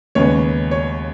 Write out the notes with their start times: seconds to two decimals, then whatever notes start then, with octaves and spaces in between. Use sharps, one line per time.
0.15 D#2 C#3 G#3 B3 C#5
0.71 C#5